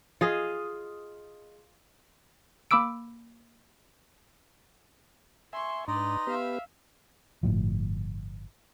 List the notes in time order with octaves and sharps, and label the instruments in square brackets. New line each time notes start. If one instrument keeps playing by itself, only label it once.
[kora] F4 G#4 D#5
[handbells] A#3 B5 D6 E6 D7
[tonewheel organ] E5 G#5 [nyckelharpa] C6 C#6
[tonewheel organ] G#2 D4 [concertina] D#4 D#5 A#5 [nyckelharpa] B4 D5 [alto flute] C6
[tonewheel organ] B3 G4 B4 [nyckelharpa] E5 F5
[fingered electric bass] G1 A2 F3